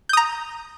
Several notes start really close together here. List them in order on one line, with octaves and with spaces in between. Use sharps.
G6 D#6 A#5